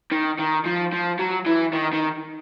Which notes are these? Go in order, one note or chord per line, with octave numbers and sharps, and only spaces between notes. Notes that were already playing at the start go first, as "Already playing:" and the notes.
D#3
D#3
F3
F3
F#3
E3
D#3
D#3